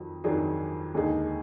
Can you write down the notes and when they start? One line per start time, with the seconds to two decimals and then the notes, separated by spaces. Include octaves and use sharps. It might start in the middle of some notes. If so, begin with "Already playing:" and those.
Already playing: F2 D#3 F#3
0.24 F2 D#3 F#3 D4 G#4
0.94 D#2 D3 G#3 D#4 G#4